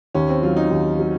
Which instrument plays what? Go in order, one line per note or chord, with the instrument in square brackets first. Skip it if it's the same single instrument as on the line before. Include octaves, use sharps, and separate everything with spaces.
[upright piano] D#2 [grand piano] C#4
[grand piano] C4
[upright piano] F#3 [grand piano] F4
[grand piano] D#4
[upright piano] D#2
F#3